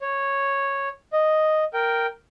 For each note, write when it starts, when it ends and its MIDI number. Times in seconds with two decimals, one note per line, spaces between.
0.01 0.89 73
1.13 1.64 75
1.74 2.07 70
1.74 2.07 79